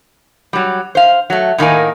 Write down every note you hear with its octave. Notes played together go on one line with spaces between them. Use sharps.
F#3 G3
C5 F5
F#3 A3
A2 D#3 A#3 G#5